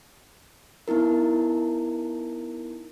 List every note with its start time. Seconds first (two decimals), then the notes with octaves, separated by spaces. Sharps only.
0.88 B3 D#4 E4 A#4